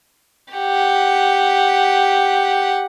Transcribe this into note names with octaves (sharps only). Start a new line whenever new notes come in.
G4 F#5